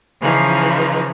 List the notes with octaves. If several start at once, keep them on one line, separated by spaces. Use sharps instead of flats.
C#3 E3 F3 D#4